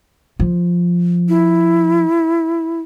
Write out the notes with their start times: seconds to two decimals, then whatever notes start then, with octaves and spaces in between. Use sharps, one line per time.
0.39 F3
1.29 E4